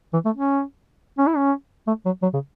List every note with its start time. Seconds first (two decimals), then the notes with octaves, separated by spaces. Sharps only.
0.13 E3
0.25 A3
0.37 C#4
1.18 C#4
1.27 E4
1.36 C#4
1.87 A3
2.05 F#3
2.22 F#3
2.34 C#3